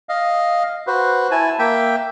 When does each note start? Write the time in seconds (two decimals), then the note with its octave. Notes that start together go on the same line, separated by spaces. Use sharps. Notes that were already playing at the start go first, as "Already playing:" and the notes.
0.09 D#5 F5
0.87 F#4 B4 C5
1.31 E4 G#5 A5
1.59 A#3 E5 G5